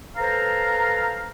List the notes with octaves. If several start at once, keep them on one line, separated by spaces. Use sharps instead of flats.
A4 B4 C5 F5 A#5